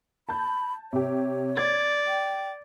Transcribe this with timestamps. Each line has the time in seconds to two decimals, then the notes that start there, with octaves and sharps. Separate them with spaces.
0.29 A5 B5 G6
0.93 C3 G4 C#5
1.57 D5 G#6 A6
2.07 G5